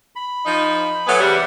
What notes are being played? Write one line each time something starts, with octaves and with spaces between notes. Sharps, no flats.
B5
F3 D#4
F#3 A3 B3 G#5
E2 C3 G3 D5 E5 F#5